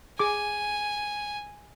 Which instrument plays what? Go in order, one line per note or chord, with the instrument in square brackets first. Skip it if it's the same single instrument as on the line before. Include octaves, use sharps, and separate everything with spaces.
[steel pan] G#4 D6 [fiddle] G#5